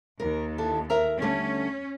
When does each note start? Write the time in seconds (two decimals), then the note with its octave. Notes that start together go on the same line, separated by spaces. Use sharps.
0.20 D#2 A#4
0.58 D4 E4 A4
0.90 A#4 E5 A#5
1.22 D3 G3 A3 C#4